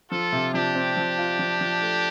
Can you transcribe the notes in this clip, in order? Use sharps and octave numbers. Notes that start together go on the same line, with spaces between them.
F3 F4 A4
C3
F3 D4 G4
C4
F3
F4
F3
F3
A3